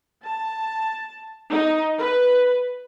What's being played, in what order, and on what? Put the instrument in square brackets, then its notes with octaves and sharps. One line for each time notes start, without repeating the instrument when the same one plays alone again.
[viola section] A5
D#4
B4